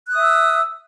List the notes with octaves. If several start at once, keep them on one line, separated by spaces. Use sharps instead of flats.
E5 D#6 E6 F#6